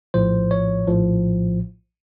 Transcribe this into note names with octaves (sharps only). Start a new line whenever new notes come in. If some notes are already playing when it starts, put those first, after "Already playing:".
A#1 A2 F3 C5
C#5
A#1 A2 F3